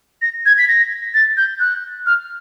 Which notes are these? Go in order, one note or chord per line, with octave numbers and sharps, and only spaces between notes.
A#6
G#6
B6
A#6
A6
G6
F#6
F6